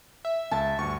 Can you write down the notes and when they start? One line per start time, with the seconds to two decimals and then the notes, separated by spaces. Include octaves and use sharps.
0.25 E5
0.51 C#2 A5
0.79 D2 G2 C#6